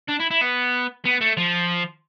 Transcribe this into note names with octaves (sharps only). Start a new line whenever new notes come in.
D4
E4
E4
B3
B3
A3
F3